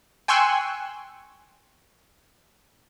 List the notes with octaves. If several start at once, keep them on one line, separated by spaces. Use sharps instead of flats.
G5 G#5 C6 C#6 E6 F#6